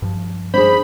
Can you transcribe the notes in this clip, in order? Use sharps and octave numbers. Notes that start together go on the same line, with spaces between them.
G2 F3
D4 D#4 G#4 C5 B5